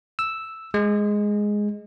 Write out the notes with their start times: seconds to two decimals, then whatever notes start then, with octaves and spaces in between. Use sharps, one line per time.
0.19 E6
0.74 G#3